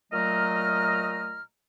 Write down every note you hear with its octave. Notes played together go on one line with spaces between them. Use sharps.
A#2 F#3 A3 D#5 A#5 F6